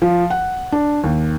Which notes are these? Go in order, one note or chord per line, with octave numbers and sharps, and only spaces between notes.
F3
F#5
D4
D#2